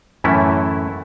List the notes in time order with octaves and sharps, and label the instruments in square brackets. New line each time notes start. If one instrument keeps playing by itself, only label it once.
[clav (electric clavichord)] F#2 A2 E3 A3 C#4 E4